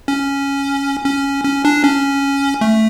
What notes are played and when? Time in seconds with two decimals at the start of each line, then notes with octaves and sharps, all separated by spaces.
0.08 C#4
1.05 C#4
1.45 C#4
1.65 D4
1.84 C#4
2.61 A3